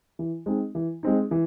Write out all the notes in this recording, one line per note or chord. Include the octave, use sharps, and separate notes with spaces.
E3
G#3 C4 D#4
E3
G#3 C4 D#4
E3